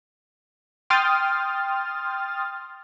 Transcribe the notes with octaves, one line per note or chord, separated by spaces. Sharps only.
G5 C6 D#6 F6 A6